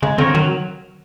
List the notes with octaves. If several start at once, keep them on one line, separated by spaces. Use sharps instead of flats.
C#3 G#3
D3 C4 F4 A#4 C#5
D#3 F#3